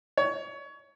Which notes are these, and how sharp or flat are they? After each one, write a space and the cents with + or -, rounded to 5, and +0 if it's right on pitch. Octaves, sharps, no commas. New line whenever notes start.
C#5 +20